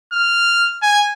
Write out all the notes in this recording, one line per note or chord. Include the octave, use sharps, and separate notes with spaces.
F6
G#5